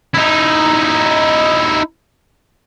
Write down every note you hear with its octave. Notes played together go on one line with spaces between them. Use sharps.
D#4 E4